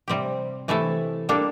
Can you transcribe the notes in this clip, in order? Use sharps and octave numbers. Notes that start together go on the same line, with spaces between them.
C3 G3 C4 G4
C3 E3 A3 E4 A4
G3 A#3 D4 A4